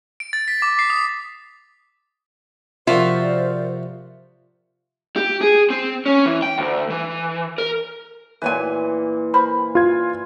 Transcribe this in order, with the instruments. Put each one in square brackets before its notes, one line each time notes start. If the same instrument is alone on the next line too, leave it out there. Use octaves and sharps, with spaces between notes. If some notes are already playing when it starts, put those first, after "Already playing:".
[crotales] D7
A6
B6
D6
C7
D#6
[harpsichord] C3 F3 F#4 [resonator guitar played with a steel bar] F4 E5 [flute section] A#4 C5 D5
[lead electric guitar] G4
G#4
C4
C#4
E3
G5
D2
E3
A#4
[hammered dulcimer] A#2 E3 [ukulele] B4 C#5 G#5
[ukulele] A#4 C5 B5
[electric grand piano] F4 G#6